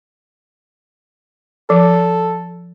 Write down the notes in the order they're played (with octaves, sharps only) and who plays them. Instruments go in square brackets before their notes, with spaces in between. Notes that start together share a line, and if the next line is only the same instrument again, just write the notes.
[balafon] F3 [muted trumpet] A4